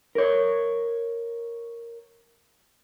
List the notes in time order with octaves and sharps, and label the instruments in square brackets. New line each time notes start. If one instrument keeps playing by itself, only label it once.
[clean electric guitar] A#4 C#5